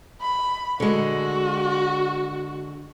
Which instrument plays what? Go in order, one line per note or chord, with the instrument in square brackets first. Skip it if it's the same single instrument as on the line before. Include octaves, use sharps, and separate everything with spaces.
[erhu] B5
[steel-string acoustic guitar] D3 G#3 [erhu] F#4